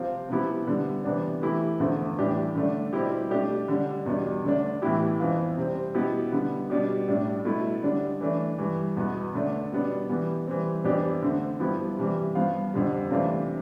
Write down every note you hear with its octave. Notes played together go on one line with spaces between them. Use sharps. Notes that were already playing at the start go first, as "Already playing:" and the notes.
Already playing: C3 F3 C4 F4
C3 F3 B3 E4 G4
D3 G3 B3
C3 E3 B3 D4
E3 A3 E4 G4
E2 D3 F3 A3
A2 E3 G3 D4 G4
D3 A3 D4
B2 G3 C4 E4 G4
B2 A3 D4 G4
D3 G3 D4
E2 B2 G3 D4
D3 A3 D4
A2 E3 B3 E4 G4
F2 E3 B3 F4
C3 G3 C4
B2 B3 E4 G4
D3 G3 B3
B2 G3 D4 G4
A2 G3 D4
B2 A3 E4
D3 G3 D4
E3 A3 D4
G2 E3 G3
E2 B2 B3
D3 A3 D4
B2 G3 B3 D4
E3 G3 B3
E3 G3 C4
F2 E3 B3 D4 G4
D3 A3 C4
G2 F3 B3 E4 G4
C3 E3 G3
G2 F3 B3 F4
F2 D3 G3
C3 E3 A3 D4 F4